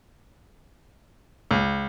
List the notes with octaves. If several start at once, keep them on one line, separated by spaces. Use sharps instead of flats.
C#2